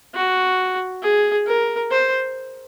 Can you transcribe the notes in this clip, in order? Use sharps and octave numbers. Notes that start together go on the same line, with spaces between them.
F#4
G#4
A#4
C5